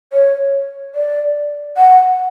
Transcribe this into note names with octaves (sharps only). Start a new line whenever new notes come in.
C#5
D5
F#5